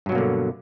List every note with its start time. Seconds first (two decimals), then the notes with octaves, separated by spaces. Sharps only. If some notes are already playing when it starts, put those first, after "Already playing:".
0.06 G2
0.09 F#3
0.12 B2
0.15 A#3
0.18 D3